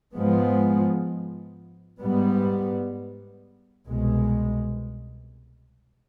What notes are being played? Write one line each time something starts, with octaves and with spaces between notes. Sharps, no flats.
G#2 F3 G#3 B3
G#2 G3 B3
C2 B2 G#3